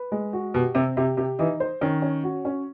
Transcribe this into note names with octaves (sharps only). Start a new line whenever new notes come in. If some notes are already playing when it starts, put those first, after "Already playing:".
Already playing: B4
G#3
F#4
B2 G4
C3 C4
C3 G4
C3 G4
E3 D#4
C5
D#3 C#4
C#4
F#4
C#4